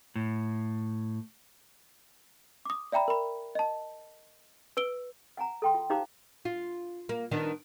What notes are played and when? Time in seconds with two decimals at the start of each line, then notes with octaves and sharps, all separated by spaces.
0.16 A2
2.65 D6 D#6
2.92 D5 E5 G5 A#5 B5
3.08 A#4 B5
3.55 D#5 A5
4.77 B4 E6 D7 G7
5.37 F#5 G#5 A#5
5.62 A4 G5 C6
5.74 F4
5.90 D#4 G4 C5 F5 A#5 D6
6.45 F4
7.09 A#3
7.31 D#3 B3 D4